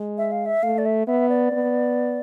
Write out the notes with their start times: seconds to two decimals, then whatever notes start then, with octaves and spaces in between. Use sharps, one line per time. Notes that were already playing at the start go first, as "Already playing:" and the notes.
Already playing: G#3
0.18 E5
0.32 F5
0.46 E5
0.63 A3 F5
0.78 D5
0.86 E5
1.07 B3 E5
1.29 D5
1.52 B3